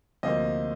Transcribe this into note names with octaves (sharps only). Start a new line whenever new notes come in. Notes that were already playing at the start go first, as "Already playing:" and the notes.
D2 C3 F3 A#3 D#5